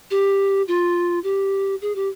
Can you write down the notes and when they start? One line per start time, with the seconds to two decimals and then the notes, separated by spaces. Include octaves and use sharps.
0.11 G4
0.68 F4
1.24 G4
1.82 G#4
1.95 G4